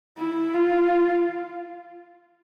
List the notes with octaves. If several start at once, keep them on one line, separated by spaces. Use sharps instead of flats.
E4
F4